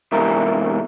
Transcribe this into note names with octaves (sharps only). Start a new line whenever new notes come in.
E2 G#2 C3 E4 A#4